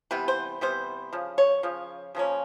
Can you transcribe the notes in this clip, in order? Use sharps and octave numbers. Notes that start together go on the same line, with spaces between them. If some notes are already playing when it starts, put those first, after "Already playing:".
C3 E3 G3 B3 B4
C5
C3 E3 G3 B3 C5
C#3 F3
C#5
C#3 F3
C#3 F3 A#3 C#4